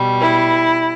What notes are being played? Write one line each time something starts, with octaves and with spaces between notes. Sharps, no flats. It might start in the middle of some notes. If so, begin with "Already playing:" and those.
Already playing: B2 G3
E4